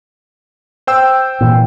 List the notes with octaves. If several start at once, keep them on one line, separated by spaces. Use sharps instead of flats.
C5 G5 E6
A#2 E3